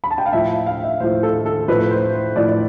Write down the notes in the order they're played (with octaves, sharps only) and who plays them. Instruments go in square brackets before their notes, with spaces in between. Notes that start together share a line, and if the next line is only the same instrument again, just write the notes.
[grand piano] B5
A5
G5
F5
A2 F3 E5
F5
E5
A2 F3 C5
A4
A4
A2 F3 B4
C5
C5
A2 F3 D5
D5